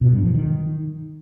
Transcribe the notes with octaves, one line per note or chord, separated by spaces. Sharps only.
B2
G2
F3
D#3